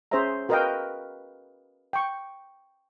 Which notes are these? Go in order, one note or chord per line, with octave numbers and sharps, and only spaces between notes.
C#4 G#4 C5 C#5 E5 A#5
F#4 A#4 B4 D#5 F5 G5
G5 C#6